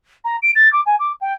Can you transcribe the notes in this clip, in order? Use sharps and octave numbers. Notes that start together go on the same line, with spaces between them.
A#5
D7
A6
D6
G#5
D6
G5